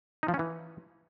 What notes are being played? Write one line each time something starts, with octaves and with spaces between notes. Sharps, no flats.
D#4
F3
C#4
E3